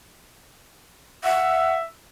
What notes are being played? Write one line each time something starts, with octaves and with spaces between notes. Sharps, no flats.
E5 F#5